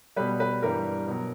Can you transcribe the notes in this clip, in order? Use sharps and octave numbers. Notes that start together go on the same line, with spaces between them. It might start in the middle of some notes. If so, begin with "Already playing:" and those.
B2 G3 B4
B4
G2 E3 G3 A#4
B2 F#3